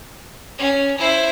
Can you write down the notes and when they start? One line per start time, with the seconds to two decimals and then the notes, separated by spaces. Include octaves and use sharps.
0.59 C#4
0.98 E4 C5